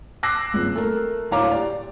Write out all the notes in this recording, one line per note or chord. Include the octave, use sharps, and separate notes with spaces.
D6 E6 F#6 A#6 C7
G#1 C#2
A3 A#4
D2 A2 C#5 F5 A#5 D6
G4 D5